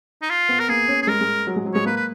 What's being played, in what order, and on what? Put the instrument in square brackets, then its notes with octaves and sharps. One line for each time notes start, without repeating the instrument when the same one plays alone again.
[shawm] D#4
F4
[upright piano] B3
[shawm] A#4
[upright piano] A#3 [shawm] G#4
[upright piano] C#4
[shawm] G#4
[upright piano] G#3 [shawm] A#4
[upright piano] G#3
F#3
G#3
F#3
[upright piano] G#3 [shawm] C#5
[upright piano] A#3 [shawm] B4
[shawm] B4